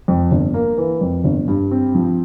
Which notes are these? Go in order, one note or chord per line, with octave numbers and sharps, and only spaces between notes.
F2
G1
A#3
E3
F2
G1
G2
C4
F3